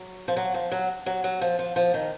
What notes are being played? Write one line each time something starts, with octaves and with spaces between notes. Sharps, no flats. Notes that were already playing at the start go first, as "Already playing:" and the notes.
Already playing: F#3
F3
F#3
F3
F#3
F#3
F#3
F3
F3
F3
D#3